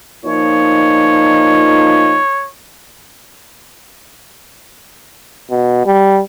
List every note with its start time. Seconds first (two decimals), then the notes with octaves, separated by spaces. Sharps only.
0.24 A#2 F3 D#4 C#5
5.50 B2
5.86 G3